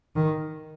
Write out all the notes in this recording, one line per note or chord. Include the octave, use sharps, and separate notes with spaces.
D#3